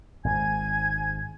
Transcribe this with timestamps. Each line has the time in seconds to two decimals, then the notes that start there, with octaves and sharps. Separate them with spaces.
0.24 G#1 G#2 G#5 G#6